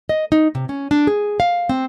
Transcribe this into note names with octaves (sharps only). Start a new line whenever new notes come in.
D#5
D#4
C3
C#4
D4
G#4
F5
C4